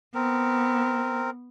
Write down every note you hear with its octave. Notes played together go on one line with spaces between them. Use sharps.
B3 C4 A#4